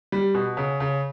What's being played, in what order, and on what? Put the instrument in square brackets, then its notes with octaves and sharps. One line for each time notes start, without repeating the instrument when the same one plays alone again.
[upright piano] G3
B2
C#3
C#3